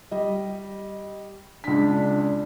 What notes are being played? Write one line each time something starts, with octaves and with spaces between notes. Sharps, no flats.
G3 D#5
C#2 D4 B6